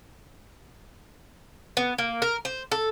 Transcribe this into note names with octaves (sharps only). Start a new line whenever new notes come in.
B3
A#3
A#4
C5
A4